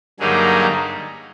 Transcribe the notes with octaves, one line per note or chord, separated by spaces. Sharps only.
G2 D3 F#3 A#3 D#4 G#4